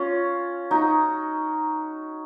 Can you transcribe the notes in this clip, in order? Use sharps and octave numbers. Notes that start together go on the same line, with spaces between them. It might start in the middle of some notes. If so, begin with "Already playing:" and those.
Already playing: C#4 F4
D#4 F#4